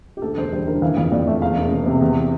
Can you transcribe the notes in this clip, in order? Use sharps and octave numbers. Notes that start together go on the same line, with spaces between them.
G4
D2 A4
E1 C5
G3 C5
D3 A#4
E3 F5
F2 F5
F2 D5
A3 E5
E2 F5
E1
E1
C3
E2